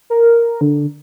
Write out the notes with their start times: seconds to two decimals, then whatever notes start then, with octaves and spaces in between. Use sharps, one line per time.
0.10 A#4
0.61 D3